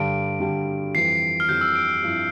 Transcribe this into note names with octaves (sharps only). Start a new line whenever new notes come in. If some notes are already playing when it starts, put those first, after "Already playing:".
Already playing: G2 D3 G3 D7
G2 D3 G3
F2 E3 G3 C4 C7
F6
F2 E3 G3 C4 G6
E6
D7
D7
G2 F3 C4 E4